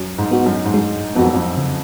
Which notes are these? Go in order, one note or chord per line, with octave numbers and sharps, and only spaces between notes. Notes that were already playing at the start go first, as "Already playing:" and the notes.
Already playing: F#2
G#2
B3 F#4
F#2
G#2
F#2 G#3
F2 B3 F#4
F#2
F2
C#3